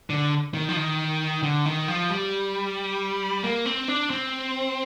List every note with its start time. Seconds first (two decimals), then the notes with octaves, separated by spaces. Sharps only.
0.10 D3
0.54 D#3
0.69 F3
0.77 D#3
1.43 D3
1.66 D#3
1.88 F3
2.10 G3
3.43 A#3
3.66 C4
3.88 D4
4.10 C4